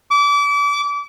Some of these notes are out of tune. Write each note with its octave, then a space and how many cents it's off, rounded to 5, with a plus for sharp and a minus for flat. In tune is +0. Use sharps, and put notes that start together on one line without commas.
D6 -30